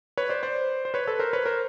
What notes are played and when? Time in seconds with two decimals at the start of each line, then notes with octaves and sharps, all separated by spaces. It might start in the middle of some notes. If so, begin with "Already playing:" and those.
0.17 B4 C#5
0.29 C5 D5
0.43 C5 D5
0.85 C5
0.94 B4 C#5
1.07 A4 B4
1.19 A#4 C5
1.33 B4 C#5
1.46 A#4 C5